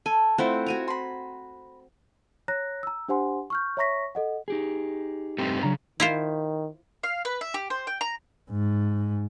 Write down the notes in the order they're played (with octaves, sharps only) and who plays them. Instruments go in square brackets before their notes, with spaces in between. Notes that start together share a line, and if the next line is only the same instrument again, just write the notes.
[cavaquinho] A4 [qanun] G#5
[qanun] A3 C4 [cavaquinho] E4 F4 F#5
[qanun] F#4 G#5 A#5
[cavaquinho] B5 C6
[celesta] C#5 A#5 F#6 A#6
A#5 E6
D4 G4 C5 F#5 G#5 C6
C#6 F6 G6
C#5 E5 A#5 C#6 A#6 B6
A4 D#5 F#5
[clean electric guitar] D#4 G4 G#4
[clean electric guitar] G2 G4 [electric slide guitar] A3 C4 D#4
[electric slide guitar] C#3 [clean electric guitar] F#3 D4 A#5
[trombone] D#3 [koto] E4 F4 C5
[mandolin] F5
B4
E5
G4
C5
G5
A#5
[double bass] G#2